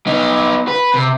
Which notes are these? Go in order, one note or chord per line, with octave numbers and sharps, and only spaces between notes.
B3 D#4
B4
C3